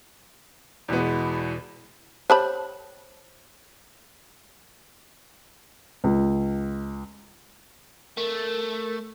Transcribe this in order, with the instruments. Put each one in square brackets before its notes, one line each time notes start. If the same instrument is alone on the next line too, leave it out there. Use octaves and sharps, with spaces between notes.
[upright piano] E2 B2 E3 G#3 B3
[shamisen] G4 A5 B5 [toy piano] C5 C#5
[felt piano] C#2
[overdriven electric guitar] A3 [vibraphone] A#4